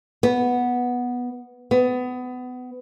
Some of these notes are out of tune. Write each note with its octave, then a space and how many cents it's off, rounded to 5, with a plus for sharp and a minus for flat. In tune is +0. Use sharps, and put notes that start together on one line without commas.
B3 -5
B3 +25